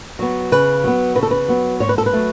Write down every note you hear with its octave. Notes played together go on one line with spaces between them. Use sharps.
F#3 B3
C#3 B4
F#3 B3
C#3 B4
A4
B4
F#3 B3
G#2 C#5
B4
A4
B4
F#3 A3